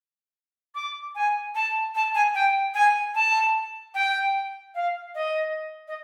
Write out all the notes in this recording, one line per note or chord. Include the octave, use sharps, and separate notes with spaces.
D6
G#5
A5
A5
G#5
G5
G#5
A5
G5
F5
D#5
D#5